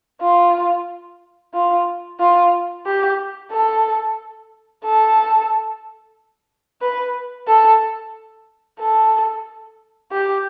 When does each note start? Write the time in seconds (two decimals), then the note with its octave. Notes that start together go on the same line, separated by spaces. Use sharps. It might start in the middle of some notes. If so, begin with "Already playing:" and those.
0.21 F4
1.54 F4
2.20 F4
2.86 G4
3.52 A4
4.84 A4
6.81 B4
7.48 A4
8.80 A4
10.12 G4